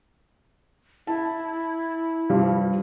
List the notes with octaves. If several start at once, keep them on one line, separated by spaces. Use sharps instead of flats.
E4 A5
G2 F3 G3